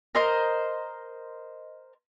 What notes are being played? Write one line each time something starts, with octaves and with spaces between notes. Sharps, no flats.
A#4 C5 D#5